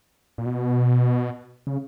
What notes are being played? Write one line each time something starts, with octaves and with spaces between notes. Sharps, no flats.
A#2
B2
C#3